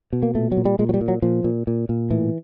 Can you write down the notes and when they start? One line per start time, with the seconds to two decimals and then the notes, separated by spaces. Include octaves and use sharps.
0.13 B2
0.23 A#3
0.35 A#2 A3
0.52 F#3
0.57 A#2
0.65 G3
0.79 A#2 G#3
0.89 F#3
0.94 G3
1.01 A#2
1.08 F#3
1.22 A#2 F3
1.44 A#2
1.67 A#2
1.89 A#2
2.10 A2 E3